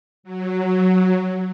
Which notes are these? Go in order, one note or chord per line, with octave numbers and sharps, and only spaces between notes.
F#3